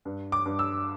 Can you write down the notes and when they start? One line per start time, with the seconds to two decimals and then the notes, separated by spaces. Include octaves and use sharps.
0.05 G2
0.32 D6
0.46 G2
0.59 E6